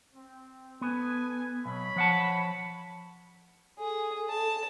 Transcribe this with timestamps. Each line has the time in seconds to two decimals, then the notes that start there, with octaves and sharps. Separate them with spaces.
0.13 C4
0.81 B3 A4 B4 G#5
1.65 B1 C#5 B5
1.96 F3 F#5 A5
3.79 G#4 A4
4.29 A5